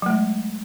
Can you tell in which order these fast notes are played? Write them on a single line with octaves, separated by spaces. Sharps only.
F#3 A3 G#3